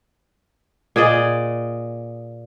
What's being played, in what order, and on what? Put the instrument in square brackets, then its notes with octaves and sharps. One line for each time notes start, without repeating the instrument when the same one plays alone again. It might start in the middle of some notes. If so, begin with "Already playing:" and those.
[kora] A#2 G#4 D5 D#5